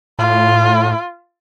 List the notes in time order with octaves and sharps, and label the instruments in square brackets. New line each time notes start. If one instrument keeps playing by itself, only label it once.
[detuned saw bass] A2 [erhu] F4